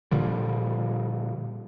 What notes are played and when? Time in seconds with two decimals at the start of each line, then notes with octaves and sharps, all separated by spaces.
0.11 A#2 D3 F3 G3